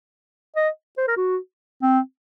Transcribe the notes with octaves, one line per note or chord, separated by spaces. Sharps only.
D#5
C5
A#4
F#4
C4